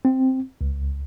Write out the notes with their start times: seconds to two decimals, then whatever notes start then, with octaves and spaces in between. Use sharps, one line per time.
0.05 C4
0.61 C#2